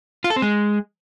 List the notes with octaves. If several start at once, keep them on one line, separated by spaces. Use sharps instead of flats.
F4
A4
C4
G#3